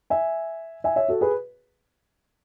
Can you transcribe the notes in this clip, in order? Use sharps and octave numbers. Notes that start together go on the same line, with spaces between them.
E5 G#5
E5 G#5
C#5 E5
F#4 A4
G#4 B4